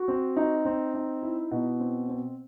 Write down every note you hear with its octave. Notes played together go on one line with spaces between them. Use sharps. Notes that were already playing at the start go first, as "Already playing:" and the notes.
Already playing: F#4
C4
D#4
C4
D#4
E4
B2
C4
C4